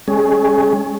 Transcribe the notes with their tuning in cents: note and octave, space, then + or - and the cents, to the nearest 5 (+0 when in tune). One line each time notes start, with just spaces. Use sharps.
G#3 -30 C#4 -5 G#4 +35